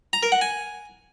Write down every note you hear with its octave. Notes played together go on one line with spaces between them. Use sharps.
A#5
A#4
F#5
G#5